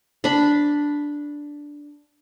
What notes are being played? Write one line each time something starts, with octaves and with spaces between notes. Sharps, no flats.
D4 B5